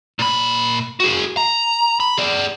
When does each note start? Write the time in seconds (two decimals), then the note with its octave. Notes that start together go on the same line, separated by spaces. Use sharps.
0.19 A#2 B5
1.00 F#4 G#4
1.37 A#5
2.00 B5
2.17 G#4 D5